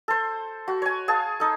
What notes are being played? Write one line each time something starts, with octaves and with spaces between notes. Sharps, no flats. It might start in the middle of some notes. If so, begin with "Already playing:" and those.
A4 C5
F#4
C#5 G#5
G#4 F5 A5
D#4 A4